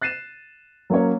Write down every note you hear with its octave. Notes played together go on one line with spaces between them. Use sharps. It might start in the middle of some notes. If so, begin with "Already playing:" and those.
F#6 A6 C7 D#7 E7
F#3 A#3 C#4 C#5